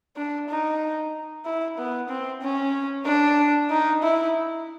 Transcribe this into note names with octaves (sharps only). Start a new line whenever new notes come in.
D4
D#4
E4
B3
C4
C#4
D4
D#4
E4